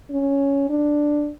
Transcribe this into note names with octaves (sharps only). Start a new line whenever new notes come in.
C#4
D4